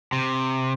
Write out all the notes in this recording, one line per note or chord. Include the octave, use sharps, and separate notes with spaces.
C3